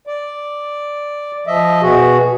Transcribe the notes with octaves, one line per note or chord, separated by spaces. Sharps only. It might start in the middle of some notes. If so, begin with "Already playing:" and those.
D5
F3 D#5 E5
B2 F#4 G#4